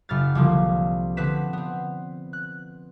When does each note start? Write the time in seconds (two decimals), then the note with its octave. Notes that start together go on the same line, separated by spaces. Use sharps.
0.09 F#1 B5 F6 A6
0.35 C2 D3 F3 A#3
1.17 D3 B3 C4 B4 B6 E7
1.53 B3 C4
2.33 F#6